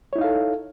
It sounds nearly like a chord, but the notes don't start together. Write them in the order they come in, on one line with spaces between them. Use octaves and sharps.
C#5 E4 D#4 F5 A4